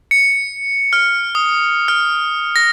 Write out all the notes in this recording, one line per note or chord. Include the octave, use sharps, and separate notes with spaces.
C#7
F6
D#6
F6
A#6